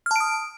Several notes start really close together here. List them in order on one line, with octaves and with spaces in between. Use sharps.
F6 A5 D7 D#6